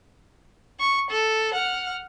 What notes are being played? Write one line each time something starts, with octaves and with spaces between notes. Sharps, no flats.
C#6
A4
F#5 F6